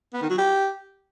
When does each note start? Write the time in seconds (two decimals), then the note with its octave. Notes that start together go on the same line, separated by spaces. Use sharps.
0.13 B3
0.22 D#3
0.30 F#3
0.38 G4